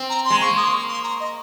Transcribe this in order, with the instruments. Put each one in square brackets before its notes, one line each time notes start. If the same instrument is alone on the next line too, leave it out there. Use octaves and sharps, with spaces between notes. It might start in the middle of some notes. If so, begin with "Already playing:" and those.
Already playing: [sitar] C4
[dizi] A#5
C6
[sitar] G#3
[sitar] A#3 [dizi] C#6
[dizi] D#6
C6
C#6
C6
A#5
D#5